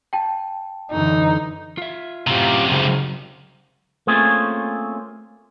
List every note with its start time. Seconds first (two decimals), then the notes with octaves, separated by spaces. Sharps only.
0.13 G5 A5
0.92 F#2 D3 E3 D#4
1.78 F4 E5
2.27 F#2 A2 C3 C4 F4 G4 A#5
2.67 G#1 E2 C#3
4.07 A3 A#3 C4 C#4 F4 G#4